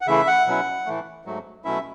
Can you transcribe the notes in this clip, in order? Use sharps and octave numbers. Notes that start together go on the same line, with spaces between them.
F#5
C#3 E3 A3 E4 E5
F#5
B2 F#3 C#4 E4
A2 E3 A3
G#2 F#3 A3
B2 F#3 A3 C#4 E4 E5